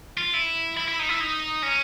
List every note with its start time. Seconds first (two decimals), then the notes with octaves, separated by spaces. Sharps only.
0.18 F4
0.34 E4
0.77 E4
0.88 E4
0.99 D#4
1.09 E4
1.21 D#4
1.63 C#4